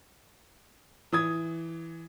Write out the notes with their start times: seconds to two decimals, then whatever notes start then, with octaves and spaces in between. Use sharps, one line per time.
1.12 E3 D#6 G#6